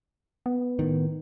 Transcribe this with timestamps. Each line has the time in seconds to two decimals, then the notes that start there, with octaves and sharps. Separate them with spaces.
0.46 B3
0.79 A2 D#3